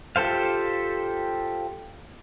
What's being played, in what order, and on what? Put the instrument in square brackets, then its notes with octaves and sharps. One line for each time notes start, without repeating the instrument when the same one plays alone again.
[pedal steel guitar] F4 G4 A4 C5 F5